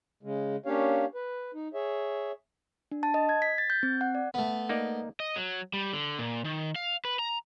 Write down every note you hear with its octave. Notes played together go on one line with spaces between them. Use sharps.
C#3 G#3
A#3 C#4 D4 G4 C#5 F5
B4
D#4
G#4 C#5 E5
D4
A5
D#5
G#6
B6
A6
G6
C4
F#5
D5
A3 B3
A#3 D#4 D5
D#5
F#3
G3
D3
A#2
D#3
F5
B4
A#5